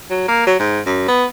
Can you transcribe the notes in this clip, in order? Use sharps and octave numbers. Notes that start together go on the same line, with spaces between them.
F#3
A#3
F#3
G#2
F#2
B3